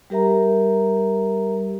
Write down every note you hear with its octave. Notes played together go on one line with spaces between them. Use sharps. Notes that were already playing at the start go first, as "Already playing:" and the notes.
G3 G4 A#4 E5 A#5